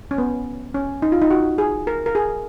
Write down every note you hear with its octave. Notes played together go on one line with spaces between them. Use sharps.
C#4
B3
C#4
D#4
F4
D#4
F#4
G#4
A#4
A#4
G#4